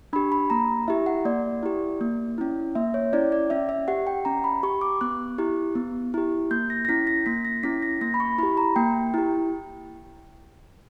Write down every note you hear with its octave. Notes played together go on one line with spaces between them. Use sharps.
D4 G4 B5
B5
A#3 A#5
E4 G4 E5
F#5
A#3 D5
E4 G4
A#3
C#4 E4
A#3 E5
C#5
C#4 E4 D5
D5
C#4 E5
E5
G4 F#5
G5
C#4 A#5
B5
G4 C#6
D6
B3 F#6
E4 G4
B3
E4 G4
A#3 G6
A#6
A#6
C#4 E4 B6
A#6
A#3 B6
A#6
C#4 E4 B6
A#6
A#3 A#6
B5
C#6
E4 G4 B5
A#5
A#3 G5
E4 G4